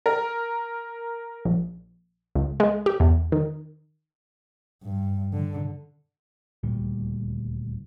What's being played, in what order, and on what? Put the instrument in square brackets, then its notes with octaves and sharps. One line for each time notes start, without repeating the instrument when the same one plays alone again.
[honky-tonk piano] A#4
[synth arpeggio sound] A#1
C#2
G#3
G4
E2
D#3
[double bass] G2
D3
[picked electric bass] D#1 D2 A#2 G3